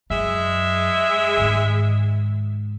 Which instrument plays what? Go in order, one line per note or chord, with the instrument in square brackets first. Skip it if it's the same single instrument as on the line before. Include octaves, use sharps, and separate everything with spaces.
[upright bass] F#2 [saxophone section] G#3 E5
[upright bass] G#2 D#3